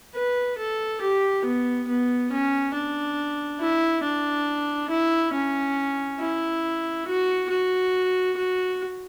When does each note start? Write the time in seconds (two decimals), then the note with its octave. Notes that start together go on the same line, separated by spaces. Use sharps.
0.15 B4
0.58 A4
1.01 G4
1.45 B3
1.88 B3
2.31 C#4
2.74 D4
3.60 E4
4.04 D4
4.90 E4
5.34 C#4
6.20 E4
7.07 F#4
7.50 F#4
8.37 F#4